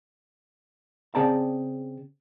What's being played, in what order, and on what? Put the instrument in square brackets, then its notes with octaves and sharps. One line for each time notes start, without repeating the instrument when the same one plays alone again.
[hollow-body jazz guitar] C#3 C4 G#4 D5 A5 A#5